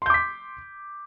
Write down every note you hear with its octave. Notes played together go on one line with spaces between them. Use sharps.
C6 D6 G6 B6